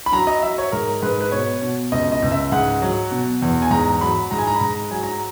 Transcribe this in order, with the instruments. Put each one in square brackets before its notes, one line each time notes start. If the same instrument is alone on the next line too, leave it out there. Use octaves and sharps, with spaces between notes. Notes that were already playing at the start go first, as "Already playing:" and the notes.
[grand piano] B5
F#3 A#5
D#5
F#3 E5
C#5
G#2 A#4
G#2 B4
B4
B2 C#5
B2
C#2 D#5
D#5
C#2
E5
G#2 F#5
F#3
B2
E2
G#5
G#2 A#5
F#3 B5
G#2 A#5
G#5
A#5
B5
G#2 A#5
F#3 G#5
A#5